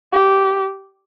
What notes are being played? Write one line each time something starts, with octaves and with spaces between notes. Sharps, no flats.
G4